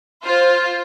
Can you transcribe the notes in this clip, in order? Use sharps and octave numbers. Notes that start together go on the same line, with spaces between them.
F4 C5